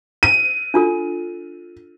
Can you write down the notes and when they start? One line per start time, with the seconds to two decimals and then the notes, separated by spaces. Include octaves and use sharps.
0.23 D#7
0.74 D4 F4 A4